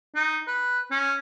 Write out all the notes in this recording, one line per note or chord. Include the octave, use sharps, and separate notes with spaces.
D#4
B4
C#4